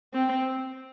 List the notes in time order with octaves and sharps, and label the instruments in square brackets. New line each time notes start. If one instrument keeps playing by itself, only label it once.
[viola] C4